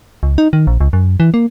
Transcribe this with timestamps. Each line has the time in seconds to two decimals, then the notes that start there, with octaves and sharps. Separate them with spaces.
0.23 C#2
0.38 D#4
0.53 D#3
0.67 A#1
0.81 C#2
0.93 F#2
1.20 E3
1.34 A#3